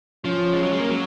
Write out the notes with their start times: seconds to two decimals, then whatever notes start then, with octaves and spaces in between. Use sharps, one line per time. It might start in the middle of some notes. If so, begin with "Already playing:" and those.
0.25 F3 C#4
0.53 G#3
0.62 F#3
0.71 G#3
0.80 A#3
0.90 F#3